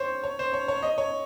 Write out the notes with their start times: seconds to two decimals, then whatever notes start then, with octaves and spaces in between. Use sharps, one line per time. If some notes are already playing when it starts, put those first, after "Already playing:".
Already playing: C5 C#5
0.24 C#5
0.39 C5
0.53 C#5
0.68 C#5
0.83 D#5
0.98 C#5